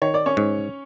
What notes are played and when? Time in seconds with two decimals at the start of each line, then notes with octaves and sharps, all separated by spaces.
0.02 D#3 C#5
0.14 D5
0.26 C#4 C#5
0.37 G#2